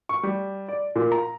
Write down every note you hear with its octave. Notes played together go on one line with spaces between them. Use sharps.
C#6
G3
D5
A#2
A#5